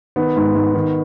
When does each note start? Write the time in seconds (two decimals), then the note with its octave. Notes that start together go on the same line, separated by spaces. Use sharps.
0.16 D#3 B3
0.36 G#2
0.55 G#2
0.74 D#3